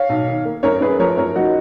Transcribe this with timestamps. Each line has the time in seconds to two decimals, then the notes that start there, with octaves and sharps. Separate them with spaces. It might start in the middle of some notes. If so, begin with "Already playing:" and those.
Already playing: C#5 F5
0.09 B1
0.27 D#3
0.45 A#3
0.63 F#2 A#4 C#5
0.81 F#2 G#4 B4
0.99 F3 A#4 C#5
1.18 F#2 A#4 C#5
1.36 F3 D#4 F#4